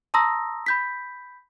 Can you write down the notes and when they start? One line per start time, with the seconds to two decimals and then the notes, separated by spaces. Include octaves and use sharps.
0.14 A5 A#5 C6 D#6 E6 A#6
0.66 B5 G6 B6